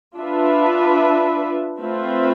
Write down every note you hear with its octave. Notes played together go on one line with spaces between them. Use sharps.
D4 F4 B4 E5
A3 C4 F4 B4 E5